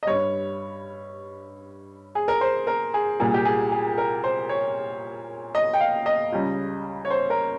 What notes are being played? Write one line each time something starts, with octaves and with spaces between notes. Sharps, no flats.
D#5
G2 G3 C#5
G#4
A#4
C5
A#4
G#4
C2 A#2 G3 G#4
G4
G#4
G#4
A#4
C5
C#5
D#5
G5
F5
D#5
C#2 C#3 G3
C#5
C5
A#4